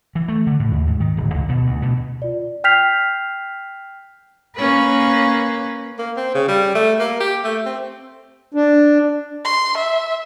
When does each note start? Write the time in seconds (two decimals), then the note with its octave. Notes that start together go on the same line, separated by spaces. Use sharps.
0.15 E3
0.28 A3
0.47 D3
0.60 A2
0.72 D#2
0.87 G#2
1.00 D#3
1.17 D1
1.34 C#2
1.49 B2
1.66 D2
1.82 B2
2.22 F4 D5
2.64 G5 F6 G6 B6 C7 F7
4.56 A#3 C#4 B4
5.99 A#3
6.17 C4
6.35 C#3
6.48 G3
6.75 A3
6.99 A#3
7.20 G4
7.44 A3
7.66 C4
8.54 D4
9.45 C6
9.78 E5